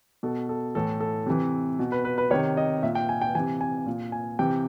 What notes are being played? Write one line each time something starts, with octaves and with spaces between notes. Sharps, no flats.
B2 A4
A4
A2 E3 A4
A4
C3 E3
B2
B4
B4
B4
C3 D#3 C#5
D#5
A#2 E5
G5
G#5
G5
C3 E3 G#5
G#5
A#2
G#5
C3 E3 G5